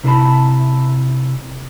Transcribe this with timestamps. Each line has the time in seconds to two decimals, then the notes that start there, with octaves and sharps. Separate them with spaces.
0.04 C3 E4 A#4 C5 A5 B5